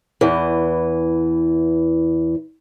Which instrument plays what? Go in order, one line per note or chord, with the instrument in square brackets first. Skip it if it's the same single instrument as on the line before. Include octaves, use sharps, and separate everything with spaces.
[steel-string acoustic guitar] E2 E3